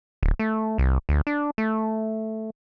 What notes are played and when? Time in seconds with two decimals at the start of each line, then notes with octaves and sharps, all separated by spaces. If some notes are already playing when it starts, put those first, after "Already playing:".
0.23 D1
0.39 A3
0.78 C2
1.09 D2
1.27 D4
1.58 A3